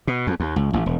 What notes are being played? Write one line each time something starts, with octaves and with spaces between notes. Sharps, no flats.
B2
F2
D#2
C#2
A1
E1